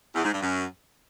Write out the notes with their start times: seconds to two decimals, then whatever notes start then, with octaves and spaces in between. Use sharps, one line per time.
0.15 E2
0.24 G#2
0.33 G2
0.43 F#2